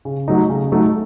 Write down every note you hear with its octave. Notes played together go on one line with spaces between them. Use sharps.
C#3
F#3 A3 D#4
C#3
F#3 A3 D#4